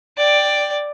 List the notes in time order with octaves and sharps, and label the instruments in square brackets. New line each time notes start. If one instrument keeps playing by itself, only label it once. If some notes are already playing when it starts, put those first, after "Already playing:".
[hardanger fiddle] D5 G5